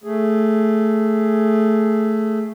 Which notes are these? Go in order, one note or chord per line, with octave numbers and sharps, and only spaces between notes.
A3 G#4